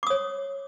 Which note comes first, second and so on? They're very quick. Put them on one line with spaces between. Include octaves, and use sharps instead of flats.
D6 D#6 C#5